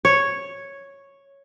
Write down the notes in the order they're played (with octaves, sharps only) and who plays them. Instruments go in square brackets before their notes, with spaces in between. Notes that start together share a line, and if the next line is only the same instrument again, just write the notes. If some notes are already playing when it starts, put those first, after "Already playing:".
[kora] C#5